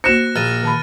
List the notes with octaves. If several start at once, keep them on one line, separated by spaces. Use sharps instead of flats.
A#3 F#4 C5 F#6 A#6 C#7 E7
A#1 F6 A6 D#7
D#3 A5 B5